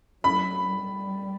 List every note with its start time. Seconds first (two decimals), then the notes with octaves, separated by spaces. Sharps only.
0.24 F#3 B5
0.68 G3